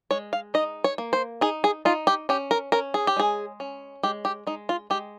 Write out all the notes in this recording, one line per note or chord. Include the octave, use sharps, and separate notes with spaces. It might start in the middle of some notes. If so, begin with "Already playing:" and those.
G#3 C#5
F5
D#4 D#5
C#5
A#3
C5
D#4 G#4
G#4
D#4 F4
G4
C#4 G4
A#4
C#4 A#4
G#4
G4
G#3 G#4
C#4
G#3 G4
G4
G#3 D#4
F4
G#3 G4